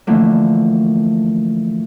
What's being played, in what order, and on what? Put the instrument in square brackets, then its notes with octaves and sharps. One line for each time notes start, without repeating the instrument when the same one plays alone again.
[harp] D3 E3 F3 A3 A#3